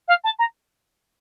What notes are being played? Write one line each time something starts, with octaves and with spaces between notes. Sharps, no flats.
F5
A5
A#5